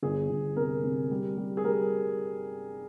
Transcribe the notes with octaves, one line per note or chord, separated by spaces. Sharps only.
G1 G#4
G1
C3 A#4
C3
G3
G3
G#4
G3 A#4